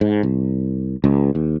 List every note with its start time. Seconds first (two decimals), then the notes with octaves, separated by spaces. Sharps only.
0.01 G#2
0.23 C2
1.04 C#2
1.35 D#2